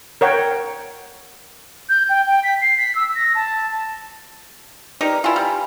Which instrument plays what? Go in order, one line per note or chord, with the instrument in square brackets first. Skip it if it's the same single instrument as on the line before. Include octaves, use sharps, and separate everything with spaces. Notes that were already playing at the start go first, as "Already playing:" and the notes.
[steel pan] A#4 C#5 F#5 G5
[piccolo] G6
G5
G5
B6
C7
B6
E6
A#6
A5
[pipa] D#4 G4 A#4 [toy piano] B4 D5
[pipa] E4 F4 [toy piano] G#5 A#5 C6
[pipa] G3